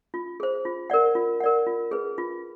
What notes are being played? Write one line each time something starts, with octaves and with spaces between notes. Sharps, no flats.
F4
G#4 C5
F4
A#4 D5 F#5
F4
A#4 D5 F#5
F4
G#4 B4
F4